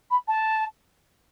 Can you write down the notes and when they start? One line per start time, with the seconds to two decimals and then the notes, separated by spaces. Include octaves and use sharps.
0.11 B5
0.28 A5